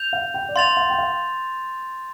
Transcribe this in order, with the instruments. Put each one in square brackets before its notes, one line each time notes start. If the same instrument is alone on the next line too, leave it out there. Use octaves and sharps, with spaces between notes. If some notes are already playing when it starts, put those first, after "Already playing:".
Already playing: [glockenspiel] G6 F7
[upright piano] F5
G5
D5
[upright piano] F5 [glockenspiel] C6 A6 F7
[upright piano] F5
G5
F5